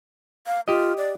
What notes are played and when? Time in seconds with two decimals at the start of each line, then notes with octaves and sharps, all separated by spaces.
0.47 F5
0.68 F4 G4 D#5
0.97 D5